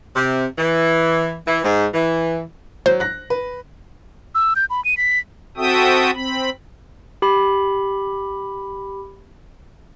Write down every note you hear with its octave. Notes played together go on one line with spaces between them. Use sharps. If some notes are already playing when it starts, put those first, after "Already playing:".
C3
E3
E3
G#2
E3
F#3 C5
F#6 A#6
B4
E6
G6
B5
D#7
B6
C4 F#4 A4 E5 G5 D#6
C4 B5
G4 B5